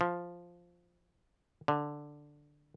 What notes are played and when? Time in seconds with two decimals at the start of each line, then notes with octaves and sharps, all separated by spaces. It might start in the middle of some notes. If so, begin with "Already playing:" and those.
0.01 F3
1.68 D3